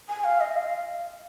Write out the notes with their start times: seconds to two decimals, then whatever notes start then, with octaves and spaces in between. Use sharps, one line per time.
0.09 G#5
0.24 F5
0.40 D#5
0.56 F5